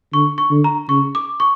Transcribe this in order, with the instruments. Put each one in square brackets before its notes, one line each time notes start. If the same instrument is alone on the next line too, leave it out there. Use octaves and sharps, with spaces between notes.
[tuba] D3 [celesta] C#6
[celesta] C#6
[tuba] D3
[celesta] A#5
[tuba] C#3 [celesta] C#6
[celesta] D6
C#6